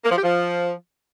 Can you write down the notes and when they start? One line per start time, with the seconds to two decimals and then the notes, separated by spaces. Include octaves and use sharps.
0.05 A#3
0.11 F3
0.17 G4
0.23 F3